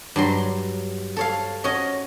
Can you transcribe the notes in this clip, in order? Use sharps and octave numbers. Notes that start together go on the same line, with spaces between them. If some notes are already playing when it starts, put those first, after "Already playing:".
G2 F#3 C6
A4 C#5 F5
C#4 F#4 C#5 D#5